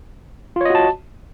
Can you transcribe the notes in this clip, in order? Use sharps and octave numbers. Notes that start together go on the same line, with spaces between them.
F4 F#4 C#5 D#5 A5